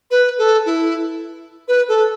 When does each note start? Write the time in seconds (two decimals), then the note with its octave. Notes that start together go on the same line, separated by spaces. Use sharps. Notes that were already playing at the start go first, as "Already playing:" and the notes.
0.10 B4
0.38 A4
0.65 E4
1.68 B4
1.88 A4